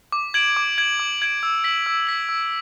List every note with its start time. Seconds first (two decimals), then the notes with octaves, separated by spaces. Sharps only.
0.12 D6
0.34 G#6 D7 F#7
0.57 D6
0.78 G#6 D7 F#7
1.00 D6
1.22 G#6 D7 F#7
1.43 E6
1.64 B6 F#7
1.86 E6
2.07 B6 F#7
2.29 E6